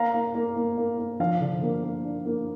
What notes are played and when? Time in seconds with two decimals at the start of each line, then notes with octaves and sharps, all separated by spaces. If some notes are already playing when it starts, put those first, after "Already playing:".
Already playing: A#3 F5 A#5
0.14 A#3
0.35 A#3
0.56 A#3
0.78 A#3
0.98 A#3
1.20 F3 F5
1.40 D3
1.62 A#3
1.84 A#3
2.04 D4
2.26 A#3